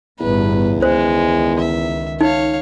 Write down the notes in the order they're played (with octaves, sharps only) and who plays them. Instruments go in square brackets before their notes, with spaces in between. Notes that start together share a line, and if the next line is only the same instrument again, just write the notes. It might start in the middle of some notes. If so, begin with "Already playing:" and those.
[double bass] G1 A2 [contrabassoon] E2 [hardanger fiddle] B4
[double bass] C#2 D#3 [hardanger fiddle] G#3 [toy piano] C5
[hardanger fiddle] E5
[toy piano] D#4 [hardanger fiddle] C#5 F5